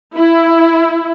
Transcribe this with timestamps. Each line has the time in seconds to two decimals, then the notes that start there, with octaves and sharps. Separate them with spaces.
0.15 E4